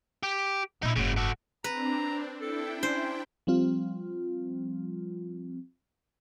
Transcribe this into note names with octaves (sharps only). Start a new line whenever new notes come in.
G4
A#2 B3 D#4 E4
F#1 G#2 C#3 F#3
F#4 A4
C4 D4 B4 A#5
D4 E4 A4 G5
C#4 C5
F3 G3 C4 F4